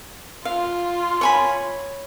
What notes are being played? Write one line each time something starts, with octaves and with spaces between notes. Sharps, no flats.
F4 F5
C#5 G#5 B5